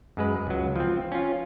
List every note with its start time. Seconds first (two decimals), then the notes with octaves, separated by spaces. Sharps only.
0.17 F#2 G#3 B4
0.47 C#2 F#3
0.76 F3 C4
1.12 C#4 F4